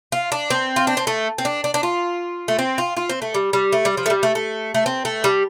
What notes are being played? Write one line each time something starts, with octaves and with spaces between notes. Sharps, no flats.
F4
D4
C4
F4
D4
C4
A3
C4
D4
D4
D4
F4
A3
C4
F4
F4
C4
A3
G3
G3
A3
G3
F3
A3
G3
A3
A3
A3
C4
A3
G3